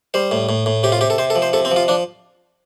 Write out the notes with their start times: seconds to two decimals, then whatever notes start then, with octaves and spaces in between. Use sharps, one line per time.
0.14 G3 C5
0.31 A2
0.49 A2
0.66 A2
0.83 C3 G4
0.92 F4
1.01 C3 G4
1.10 A4
1.18 C3 C5
1.30 A4
1.36 F3
1.42 C5
1.53 C3 A4
1.65 C4
1.71 F3
1.76 F4
1.88 F3 D4